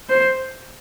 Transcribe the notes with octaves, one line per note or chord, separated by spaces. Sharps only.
C5